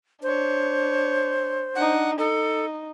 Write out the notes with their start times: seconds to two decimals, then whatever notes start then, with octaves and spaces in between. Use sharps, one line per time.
0.23 D4 C5 C#5
1.75 D4 D#4 F#5
2.18 D#4 A4